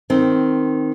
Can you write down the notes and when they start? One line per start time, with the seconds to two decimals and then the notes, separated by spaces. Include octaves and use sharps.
0.10 D#3 C4